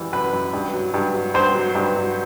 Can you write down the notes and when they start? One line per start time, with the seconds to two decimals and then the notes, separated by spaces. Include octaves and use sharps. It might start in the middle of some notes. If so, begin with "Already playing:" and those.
Already playing: F#2 E3 G3
0.13 F#2 B4
0.33 F#2
0.53 G2
0.74 F#3
0.94 G2
1.14 F#3
1.34 G2 C5
1.55 F#3
1.75 G2
1.96 F#3